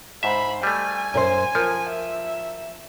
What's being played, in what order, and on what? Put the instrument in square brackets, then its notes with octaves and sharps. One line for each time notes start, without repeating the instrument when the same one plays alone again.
[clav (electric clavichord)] G#2 E5 [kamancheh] C5 B5
[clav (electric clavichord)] G3 A3 [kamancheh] G#5
[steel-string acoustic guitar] F#2 A#4 C5
[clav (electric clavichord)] F3 [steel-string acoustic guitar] A#4
[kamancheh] E5